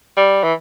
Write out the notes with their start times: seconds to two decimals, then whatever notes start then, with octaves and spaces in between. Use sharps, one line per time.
0.17 G3
0.43 E3